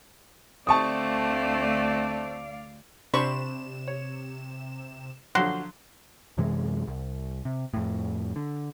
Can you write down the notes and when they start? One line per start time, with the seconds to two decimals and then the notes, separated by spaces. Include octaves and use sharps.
0.67 D2 A3 C4 D5 F5 A5 C#6 D#6
3.14 C3 D4 C5 B5 C#6 E7
3.88 C#5
5.35 D3 F3 F#3 F#4 C6
6.37 F#2 C3 E3 G#3
6.88 C2
7.45 C3
7.73 F2 A2
8.36 D3